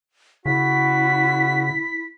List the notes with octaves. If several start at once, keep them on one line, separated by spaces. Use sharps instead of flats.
C#3 E4 F#4 B6